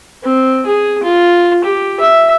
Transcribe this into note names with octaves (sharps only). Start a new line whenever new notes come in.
C4
G#4
F4
G4
E5